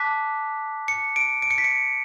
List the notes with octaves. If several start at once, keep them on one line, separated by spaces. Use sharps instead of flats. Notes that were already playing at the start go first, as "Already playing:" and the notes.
Already playing: A5 D6 F#6 B6
C#7
D7
D7
C#7
B6
C#7